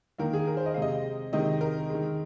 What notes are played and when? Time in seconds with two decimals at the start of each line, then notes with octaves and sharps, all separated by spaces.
0.18 D#3 A#3 A#4
0.33 G#4
0.47 A#4
0.57 C5
0.66 D#5
0.74 C3 G#3 F5
0.82 D#5
1.33 C3 D#3 G#3 D#5
1.61 A#4
1.90 D#3 G#3